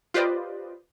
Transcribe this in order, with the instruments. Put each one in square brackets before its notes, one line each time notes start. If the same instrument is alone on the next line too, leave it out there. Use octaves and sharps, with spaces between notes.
[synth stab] F4 G4 B4 C5 D5 D#5